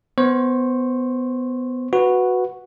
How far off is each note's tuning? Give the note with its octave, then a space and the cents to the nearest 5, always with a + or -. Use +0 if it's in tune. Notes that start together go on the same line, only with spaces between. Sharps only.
B3 +15 C5 +0 C#6 -20
F#4 -5 B4 +0